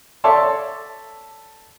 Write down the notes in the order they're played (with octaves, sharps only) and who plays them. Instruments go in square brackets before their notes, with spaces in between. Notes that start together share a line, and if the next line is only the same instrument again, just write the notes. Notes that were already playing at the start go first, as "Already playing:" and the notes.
[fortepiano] A4 C#5 D5 E5 A5 C6